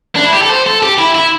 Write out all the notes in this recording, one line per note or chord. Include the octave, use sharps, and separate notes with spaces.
D4
E4
G4
A4
C5
A4
G4
E4
E4